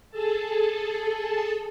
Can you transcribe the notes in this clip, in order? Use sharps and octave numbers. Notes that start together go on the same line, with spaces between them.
G#4 A4 A5